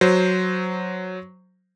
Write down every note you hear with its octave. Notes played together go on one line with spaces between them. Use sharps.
F#3 C5